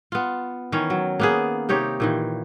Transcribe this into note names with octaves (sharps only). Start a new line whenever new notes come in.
B3 F4
D#3 E3 C#4
F#3
A#3 B3 G#4
C3 D#4 G4 C#5
A#2 D#3 E3